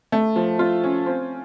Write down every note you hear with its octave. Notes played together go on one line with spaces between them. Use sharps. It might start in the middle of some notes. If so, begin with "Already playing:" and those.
A3
F3
F4
C#4
C4